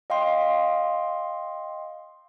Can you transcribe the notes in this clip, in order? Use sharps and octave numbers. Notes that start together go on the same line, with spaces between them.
D#5 F5 G5 C6